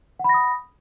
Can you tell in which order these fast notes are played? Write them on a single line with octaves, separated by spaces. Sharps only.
F#5 B5 A#6 D#6